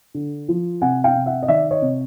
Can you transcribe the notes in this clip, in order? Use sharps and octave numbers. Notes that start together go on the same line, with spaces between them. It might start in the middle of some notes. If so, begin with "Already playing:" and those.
D3
F3
C3 F#5 G#5
F5 G5
C3
E5 F#5
D#5
D#3 D5 E5
C#5 D#5
C3